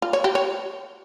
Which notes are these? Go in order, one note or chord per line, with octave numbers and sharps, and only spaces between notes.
F4
C#5
G4
C#5